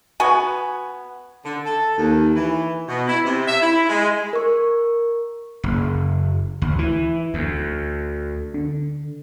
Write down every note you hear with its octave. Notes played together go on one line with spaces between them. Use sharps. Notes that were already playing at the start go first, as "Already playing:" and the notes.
B3 F#4 G#5
D3
A4
D#2
E3
B2
E4
C3
E5
E4
G#3
A#4 C#6
F#1
D2
E3
D2
D3